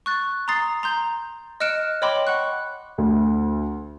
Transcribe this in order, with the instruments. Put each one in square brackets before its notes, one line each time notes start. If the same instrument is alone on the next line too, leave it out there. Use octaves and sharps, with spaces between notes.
[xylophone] C#6 F#6 A6
A#5 C6 D#6 A6 C7
A#5 C6 G6
D#5 F6 F#6 C#7 D7 E7
C#5 D#5 G5 B5 C6 D6
F#5 C#6 F#6
[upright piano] D2